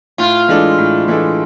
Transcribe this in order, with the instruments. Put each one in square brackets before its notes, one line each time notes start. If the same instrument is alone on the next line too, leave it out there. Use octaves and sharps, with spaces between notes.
[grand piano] A2 [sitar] F4
[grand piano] E3 G#3 D4 A4
A2
E3 G#3 D4 A4